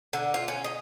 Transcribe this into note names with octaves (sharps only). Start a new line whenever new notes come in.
D3
F4
C#4
D#5